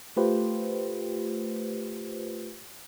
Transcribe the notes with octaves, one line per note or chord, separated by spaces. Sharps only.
A3 F4 G4 B4 C5